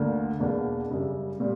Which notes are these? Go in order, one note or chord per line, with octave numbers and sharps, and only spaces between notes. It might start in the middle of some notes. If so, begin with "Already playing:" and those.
Already playing: D2 D3 A#3
E2 B2 A#3 D4
F#2 C#3 G3
A#2 G3